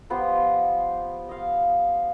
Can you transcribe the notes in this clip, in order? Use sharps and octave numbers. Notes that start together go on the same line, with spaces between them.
F3 B3 G4 C5
D#5 F5